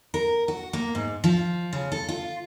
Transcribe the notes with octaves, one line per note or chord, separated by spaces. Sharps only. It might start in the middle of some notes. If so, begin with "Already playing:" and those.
A#4
F#4
A#3
G#2
F3
C#3
A4
F4